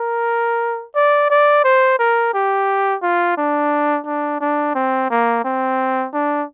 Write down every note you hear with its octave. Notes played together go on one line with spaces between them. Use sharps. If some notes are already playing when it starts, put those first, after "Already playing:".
Already playing: A#4
D5
D5
C5
A#4
G4
F4
D4
D4
D4
C4
A#3
C4
D4